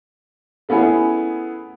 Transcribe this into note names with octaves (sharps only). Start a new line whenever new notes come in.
A3 B3 C#4 E4 G#4